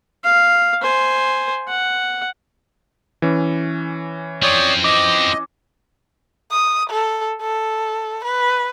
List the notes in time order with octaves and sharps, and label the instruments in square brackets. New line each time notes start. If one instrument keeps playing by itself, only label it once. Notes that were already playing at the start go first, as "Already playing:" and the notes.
[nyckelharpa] F5
C5 G#5
F#5
[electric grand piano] E3 C#4
[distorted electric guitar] F3 C4 [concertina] C#5 D5 D#6
[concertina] D#5 [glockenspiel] D6
[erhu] D#6
A4
A4
B4